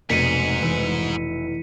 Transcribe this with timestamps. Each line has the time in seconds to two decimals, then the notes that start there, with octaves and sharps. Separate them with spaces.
0.10 F1 G#2 B2 B6 C#7 D#7
0.62 E3